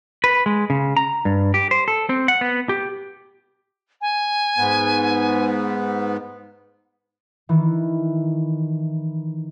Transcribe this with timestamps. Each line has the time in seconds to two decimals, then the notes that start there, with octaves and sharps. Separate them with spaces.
0.24 B4
0.46 G#3
0.70 C#3
0.97 A#5
1.25 G2
1.54 G4
1.71 C5
1.88 A4
2.09 C4
2.28 F#5
2.41 B3
2.69 G4
4.01 G#5
4.58 G#2 B3
7.49 D#3 E3